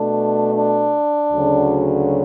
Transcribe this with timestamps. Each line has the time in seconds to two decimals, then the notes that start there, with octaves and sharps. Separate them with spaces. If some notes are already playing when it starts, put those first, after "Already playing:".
Already playing: B2 A3 D4
0.54 D4
1.32 D2 C#3 F#3